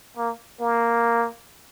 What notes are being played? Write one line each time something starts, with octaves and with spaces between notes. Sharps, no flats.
A#3
A#3